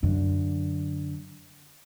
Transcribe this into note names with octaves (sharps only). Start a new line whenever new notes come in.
F#2 D3